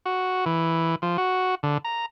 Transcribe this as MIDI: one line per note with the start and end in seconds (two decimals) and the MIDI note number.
0.06 0.45 66
0.46 0.95 52
1.02 1.17 53
1.18 1.55 66
1.63 1.78 50
1.85 2.06 82